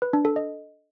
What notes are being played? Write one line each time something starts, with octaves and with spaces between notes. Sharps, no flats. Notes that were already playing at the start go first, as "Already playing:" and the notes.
B4
D4
A4
D#5